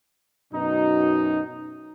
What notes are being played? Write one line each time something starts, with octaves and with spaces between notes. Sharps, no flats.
F#2 B2 D#4